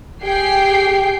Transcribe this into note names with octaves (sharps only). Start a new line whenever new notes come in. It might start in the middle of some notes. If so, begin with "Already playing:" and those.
G4 G#4 G5 C7